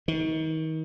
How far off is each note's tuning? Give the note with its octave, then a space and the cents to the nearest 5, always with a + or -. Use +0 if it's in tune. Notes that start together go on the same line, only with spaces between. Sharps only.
D#3 +35